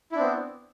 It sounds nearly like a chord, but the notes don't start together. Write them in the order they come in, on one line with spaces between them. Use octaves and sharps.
E4 D4 C4 B3